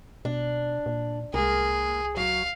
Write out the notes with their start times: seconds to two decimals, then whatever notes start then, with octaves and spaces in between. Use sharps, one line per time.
0.25 B2 D4
0.86 A#2
1.34 C2 G#3 A#3 G#4 A#4
2.17 F#3 F#4 F5